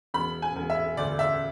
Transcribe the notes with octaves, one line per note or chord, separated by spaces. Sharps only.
E1 B5
G#5
E1
E5
D2 D5
E5